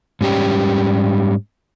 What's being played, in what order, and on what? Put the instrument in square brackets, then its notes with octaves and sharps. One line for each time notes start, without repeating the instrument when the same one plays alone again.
[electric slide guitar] G#2 G3 C#4 G4